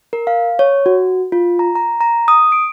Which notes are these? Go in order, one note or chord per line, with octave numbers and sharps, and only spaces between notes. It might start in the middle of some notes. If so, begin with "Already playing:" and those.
A#4
F5
C#5
F#4
F4
A#5
A#5
A#5
D#6
D7